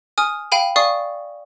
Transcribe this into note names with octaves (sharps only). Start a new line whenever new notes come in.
G#5 D#6 F6
F5 G5 B5 D#7
D5 F5 G#5 C#6 D#6